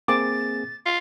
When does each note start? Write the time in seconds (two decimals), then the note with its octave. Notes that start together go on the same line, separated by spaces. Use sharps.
0.08 A#3 C4 G#4 D6 A6
0.86 F4